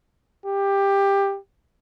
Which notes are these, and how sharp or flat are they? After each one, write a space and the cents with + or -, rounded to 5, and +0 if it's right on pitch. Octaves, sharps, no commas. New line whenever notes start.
G4 +15